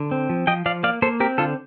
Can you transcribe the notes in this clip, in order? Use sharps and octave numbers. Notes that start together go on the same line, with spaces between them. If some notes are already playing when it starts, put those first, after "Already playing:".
Already playing: D3
C4
F3
F3 D#5 G5
F3 D5 F5
A#3 D5 F5
A#3 A4 C5
C4 G4 A#4
D3 F4 A4